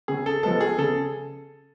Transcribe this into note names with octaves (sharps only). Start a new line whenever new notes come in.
C#3 G#4
A4
F3 G#3 B3 A4
G#4
C#3 A4